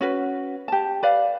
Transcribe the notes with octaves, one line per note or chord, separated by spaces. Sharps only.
C#4 F#4 B4
G4 A5
B4 D5 F5